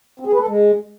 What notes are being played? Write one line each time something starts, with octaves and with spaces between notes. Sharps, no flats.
C4
G#4
B4
A4
G#3